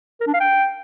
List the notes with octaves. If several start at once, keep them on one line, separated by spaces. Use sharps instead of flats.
A#4
D4
F5
G5